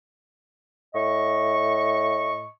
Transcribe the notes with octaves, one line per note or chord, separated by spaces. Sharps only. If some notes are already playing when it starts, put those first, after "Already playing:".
A2 D#5 C#6